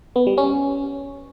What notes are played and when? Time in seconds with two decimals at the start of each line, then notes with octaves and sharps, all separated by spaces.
0.16 B3
0.27 G3
0.38 C#4